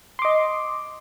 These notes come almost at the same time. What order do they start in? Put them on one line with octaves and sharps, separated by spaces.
C6 D6 D#5